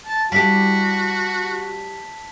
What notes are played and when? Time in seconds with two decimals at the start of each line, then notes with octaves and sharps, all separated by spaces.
0.06 A5
0.32 G3 E4 F#4 G4 A5 B6